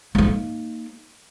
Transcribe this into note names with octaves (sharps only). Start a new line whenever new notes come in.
A#3 D#4